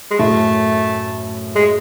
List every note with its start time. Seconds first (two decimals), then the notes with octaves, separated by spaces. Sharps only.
0.11 G#3
0.19 F#2 A2 A3
1.56 G#3